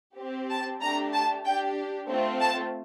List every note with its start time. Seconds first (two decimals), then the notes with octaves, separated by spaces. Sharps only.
0.18 C4 G4
0.50 A5
0.81 A3 D4 G4 A#5
1.13 A5
1.45 D4 G4 G5
2.09 A3 C4 F4
2.40 A5